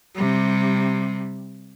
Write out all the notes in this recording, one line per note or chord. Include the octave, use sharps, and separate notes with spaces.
C3 G3